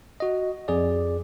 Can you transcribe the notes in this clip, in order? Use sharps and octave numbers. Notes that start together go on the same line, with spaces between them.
F#4 D#5
F2 G#4 D5